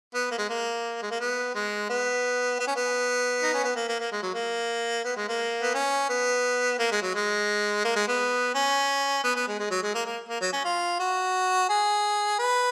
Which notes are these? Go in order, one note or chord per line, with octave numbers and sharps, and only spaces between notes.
B3
A#3
G#3
A#3
G#3
A#3
B3
G#3
B3
B3
C#4
B3
D#4
C#4
B3
A#3
A#3
A#3
G#3
F#3
A#3
B3
G#3
A#3
B3
C#4
B3
A#3
G#3
F#3
G#3
A#3
G#3
B3
C#4
B3
B3
G#3
G#3
F#3
G#3
A#3
A#3
A#3
F#3
C#4
F4
F#4
G#4
B4